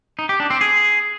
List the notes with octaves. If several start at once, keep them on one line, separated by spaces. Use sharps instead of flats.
D#4
G4
D4
C4
G#4